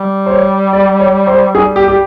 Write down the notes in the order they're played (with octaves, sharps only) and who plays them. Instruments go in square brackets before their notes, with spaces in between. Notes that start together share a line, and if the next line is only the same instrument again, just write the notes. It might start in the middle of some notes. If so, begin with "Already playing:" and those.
Already playing: [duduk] G3
[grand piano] C5
C#5
D5
C#5
C5
[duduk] G3 [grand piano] G#4
[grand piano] G4
G4